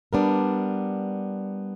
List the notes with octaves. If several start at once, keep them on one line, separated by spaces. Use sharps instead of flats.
G3 B3 D4 A#4